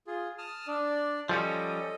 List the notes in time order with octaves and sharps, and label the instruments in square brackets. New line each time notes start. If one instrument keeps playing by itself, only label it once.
[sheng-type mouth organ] F4 G#4
A5 D#6 F6
D4 D5
[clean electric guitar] F3 G3 C#4 [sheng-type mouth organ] A4 D#5